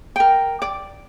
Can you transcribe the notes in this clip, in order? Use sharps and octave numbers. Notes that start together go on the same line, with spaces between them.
A#4 G5
D5